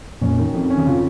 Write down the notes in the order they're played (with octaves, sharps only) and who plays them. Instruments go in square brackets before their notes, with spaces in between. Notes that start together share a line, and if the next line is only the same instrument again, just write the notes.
[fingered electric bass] F2 A#2 [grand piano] C#4
[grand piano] D#3
F2
C#4
[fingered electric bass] D#3
[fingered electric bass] C#3 [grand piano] F4